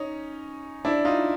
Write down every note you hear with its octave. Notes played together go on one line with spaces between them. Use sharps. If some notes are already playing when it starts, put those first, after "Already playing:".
Already playing: C#4 D#4
D4 E4
D#4 F4